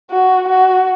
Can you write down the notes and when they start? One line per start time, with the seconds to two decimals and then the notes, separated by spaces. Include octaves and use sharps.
0.11 F#4
0.49 F#4